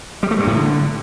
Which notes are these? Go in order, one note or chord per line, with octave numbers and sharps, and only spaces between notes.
G3
A3
G2
A2
D3